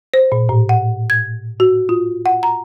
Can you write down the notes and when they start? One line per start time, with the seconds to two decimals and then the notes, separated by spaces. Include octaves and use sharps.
0.14 C5
0.32 A#2
0.49 A2
0.69 F#5
1.10 G#6
1.60 F#4
1.89 F4
2.26 F#5
2.43 A#5